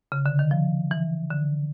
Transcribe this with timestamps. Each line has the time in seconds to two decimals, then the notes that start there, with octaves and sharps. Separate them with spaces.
0.12 C#3
0.26 D3
0.39 D#3
0.51 F3
0.91 E3
1.30 D3